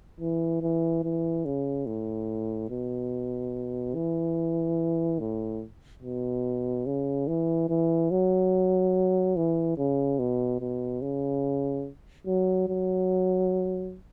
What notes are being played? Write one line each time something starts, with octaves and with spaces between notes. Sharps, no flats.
E3
E3
E3
C#3
A2
B2
E3
A2
B2
C#3
E3
E3
F#3
E3
C#3
B2
B2
C#3
F#3
F#3